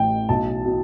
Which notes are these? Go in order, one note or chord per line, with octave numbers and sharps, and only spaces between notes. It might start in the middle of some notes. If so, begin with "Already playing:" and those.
Already playing: A1 A2 G5
B1 A5
B2